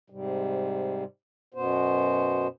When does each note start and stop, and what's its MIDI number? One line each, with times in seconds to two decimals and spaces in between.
0.10 1.04 44
0.10 1.04 48
0.10 1.04 55
1.54 2.47 42
1.54 2.47 47
1.54 2.47 59
1.54 2.47 72